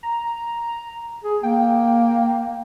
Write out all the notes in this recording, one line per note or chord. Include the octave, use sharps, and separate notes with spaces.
A#5
G#4
A#3 G5